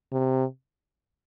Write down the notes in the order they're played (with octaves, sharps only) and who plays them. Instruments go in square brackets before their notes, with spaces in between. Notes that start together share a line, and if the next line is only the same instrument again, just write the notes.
[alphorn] C3